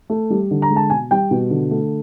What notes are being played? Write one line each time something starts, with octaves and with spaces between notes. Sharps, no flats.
A3
G3
D3
A#5
G#3
A5
B2 G#5
G3 G5
B2
D3
A3